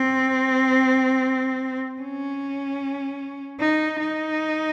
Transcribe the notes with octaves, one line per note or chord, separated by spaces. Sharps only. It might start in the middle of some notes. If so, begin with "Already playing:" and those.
Already playing: C4
C#4
D#4
D#4